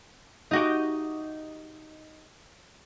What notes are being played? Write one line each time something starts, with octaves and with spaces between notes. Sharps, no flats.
D#4 F#4 G4